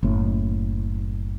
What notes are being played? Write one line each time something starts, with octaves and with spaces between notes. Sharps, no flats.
F#1 A2